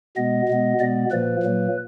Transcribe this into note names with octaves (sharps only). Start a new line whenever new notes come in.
B2 G#3 B3 D#5
B2 G#3 B3
B2 G#3 B3 D5
A#2 F3 A#3 B4
A#2 F#3 A#3